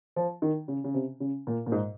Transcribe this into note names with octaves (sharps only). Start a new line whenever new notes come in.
F3
D#3
C#3
C#3
C3
C#3
A#2
A#2
G#2